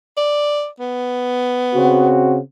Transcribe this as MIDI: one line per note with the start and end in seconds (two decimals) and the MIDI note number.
0.17 0.67 74
0.80 2.13 59
1.74 2.38 49
1.74 2.38 60
1.74 2.38 66